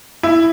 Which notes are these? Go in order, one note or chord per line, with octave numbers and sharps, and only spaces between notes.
E4